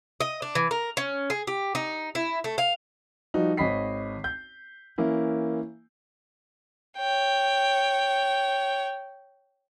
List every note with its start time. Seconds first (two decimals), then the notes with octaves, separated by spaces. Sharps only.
0.21 D#5
0.42 D4
0.55 E3
0.71 A#4
0.97 C#4
1.30 G#4
1.47 G4
1.75 D#4
2.15 E4
2.44 A3
2.58 F5
3.34 F3 G3 D#4 F#4
3.57 G#1 C#5 D#5 B5 B6 C7
4.24 G6
4.98 E3 A#3 C#4 E4
6.98 C#5 G5